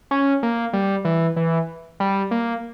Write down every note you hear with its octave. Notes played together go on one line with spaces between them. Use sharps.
C#4
A#3
G3
E3
E3
G3
A#3